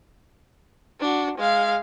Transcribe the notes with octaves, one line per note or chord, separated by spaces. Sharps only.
D4 F#4
G#3 F5